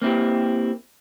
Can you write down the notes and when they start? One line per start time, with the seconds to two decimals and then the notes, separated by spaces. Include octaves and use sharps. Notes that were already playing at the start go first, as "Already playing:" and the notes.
0.02 A#3 C4 E4 G4